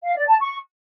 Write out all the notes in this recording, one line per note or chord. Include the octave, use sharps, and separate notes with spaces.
F5
D5
A5
C#6